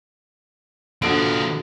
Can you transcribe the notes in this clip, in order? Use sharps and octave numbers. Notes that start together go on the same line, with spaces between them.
B2 D3 F3 G#4 D7